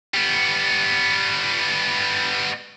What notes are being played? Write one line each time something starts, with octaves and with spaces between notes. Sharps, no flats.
G3 B3